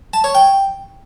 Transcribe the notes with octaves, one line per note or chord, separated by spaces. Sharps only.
A5
C#5
G5